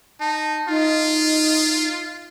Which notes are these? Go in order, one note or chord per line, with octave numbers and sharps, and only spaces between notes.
D#4 A5
D#4 F4